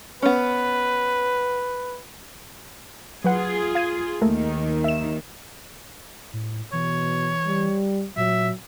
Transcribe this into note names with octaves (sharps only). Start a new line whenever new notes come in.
B3 C#4 B4
F#3 F4 G#4 B4 F#5
F5 G#6 D#7
D#2 D#3 A3 A#3 A#4
E5 E7
A2
B2 E3 C#5
G3
A#2 F#3 E5